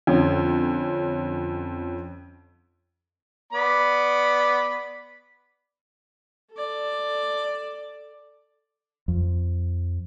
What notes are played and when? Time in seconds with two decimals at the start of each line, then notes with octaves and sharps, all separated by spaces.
0.07 F2 D3 C#4
3.52 B3 D5 B5
6.53 A4 D5
9.08 F2